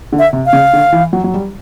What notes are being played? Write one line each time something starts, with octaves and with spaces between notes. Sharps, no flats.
D3
E5
C3
F5
C#3
D3
E3
F#3
F#3
G3